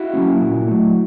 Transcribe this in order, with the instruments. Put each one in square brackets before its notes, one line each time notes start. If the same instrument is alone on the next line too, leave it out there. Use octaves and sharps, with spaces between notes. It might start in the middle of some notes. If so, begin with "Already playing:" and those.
Already playing: [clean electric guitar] E4 F#4
F#3 A#3 C#4
A#2
F#3 A3